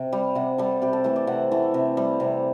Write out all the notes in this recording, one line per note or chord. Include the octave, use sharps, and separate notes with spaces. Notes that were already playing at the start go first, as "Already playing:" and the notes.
Already playing: C3
G3
C3 F#5
G3 A4
C3 G4
A4
E3 A3 B4
D5
C3 F#5
E3 A3
C3
G3
C3